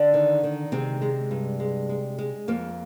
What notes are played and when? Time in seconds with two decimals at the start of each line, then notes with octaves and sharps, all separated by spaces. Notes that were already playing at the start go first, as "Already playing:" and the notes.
Already playing: D3 D4
0.14 D#3
0.44 D#3
0.72 C3 G#3 C4
1.01 G#3
1.31 G2
1.60 G#3
1.89 G#3
2.18 G#3
2.48 F2 A#3